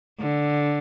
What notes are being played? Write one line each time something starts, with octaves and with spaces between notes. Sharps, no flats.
D3